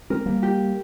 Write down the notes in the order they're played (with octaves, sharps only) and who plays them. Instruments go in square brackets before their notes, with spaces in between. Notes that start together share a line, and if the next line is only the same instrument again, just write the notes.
[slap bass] G#3 C4 [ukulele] A#4
[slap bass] G3 A#3
[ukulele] G4